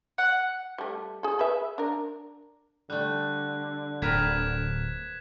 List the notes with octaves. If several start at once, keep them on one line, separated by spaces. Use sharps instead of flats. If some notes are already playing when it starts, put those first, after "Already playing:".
F#5
G3 A3
G#4 A4
G#4 B4 E5
D4 A#4
D3 G3 A3 F#6
D1 C4 A#4 B4 G#6 B6 E7